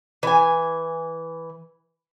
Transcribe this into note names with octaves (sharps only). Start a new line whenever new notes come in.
E3 G#5